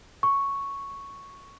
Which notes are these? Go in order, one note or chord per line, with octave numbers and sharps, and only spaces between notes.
C#6